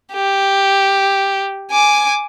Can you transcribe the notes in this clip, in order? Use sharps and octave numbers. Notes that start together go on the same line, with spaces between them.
G4
G#5 D6